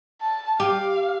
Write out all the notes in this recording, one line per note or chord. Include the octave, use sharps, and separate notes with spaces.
A5
G4 F5